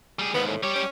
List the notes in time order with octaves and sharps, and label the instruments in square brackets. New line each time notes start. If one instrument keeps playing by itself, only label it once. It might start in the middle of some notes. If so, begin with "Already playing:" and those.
[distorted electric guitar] G3 G#4
[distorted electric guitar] D#2 G#2 [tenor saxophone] B3
[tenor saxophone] A2
[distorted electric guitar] G3 G4 [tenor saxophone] C#5
[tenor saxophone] C#4